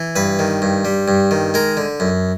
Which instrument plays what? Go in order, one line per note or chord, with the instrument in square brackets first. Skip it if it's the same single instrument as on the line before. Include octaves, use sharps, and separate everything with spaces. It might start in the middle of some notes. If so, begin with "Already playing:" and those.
Already playing: [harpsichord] E3
G2 B4
D#3
G2
G3
G2
D#3
G#3 A#4
D3
F#2